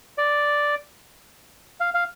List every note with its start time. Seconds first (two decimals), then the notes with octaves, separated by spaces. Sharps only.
0.18 D5
1.80 F5
1.94 F5